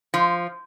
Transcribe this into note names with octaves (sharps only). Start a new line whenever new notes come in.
F3